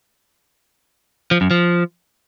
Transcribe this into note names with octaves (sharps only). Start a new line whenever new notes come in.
F3
F#2
F3